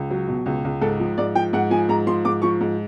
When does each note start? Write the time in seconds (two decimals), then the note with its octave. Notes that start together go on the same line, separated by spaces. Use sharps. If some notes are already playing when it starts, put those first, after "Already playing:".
Already playing: C#2
0.11 F#3
0.28 B2
0.46 C#2
0.64 C#2
0.81 G#2 A4
1.00 F3
1.18 G#2 D5
1.35 F3 G5
1.53 G#2 F#5
1.70 F3 G#5
1.89 G#2 A#5
2.06 F3 C6
2.25 G#2 D6
2.42 F3 C#6
2.60 G#2